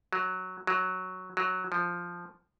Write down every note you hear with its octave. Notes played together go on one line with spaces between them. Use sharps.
F#3
F#3
F#3
F3